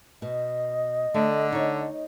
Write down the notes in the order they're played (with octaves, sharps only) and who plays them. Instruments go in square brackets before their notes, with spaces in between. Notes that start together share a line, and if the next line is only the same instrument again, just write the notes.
[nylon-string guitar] B2 [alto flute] D#5
[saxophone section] D3 [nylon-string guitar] A3
[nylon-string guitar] D#4 C#5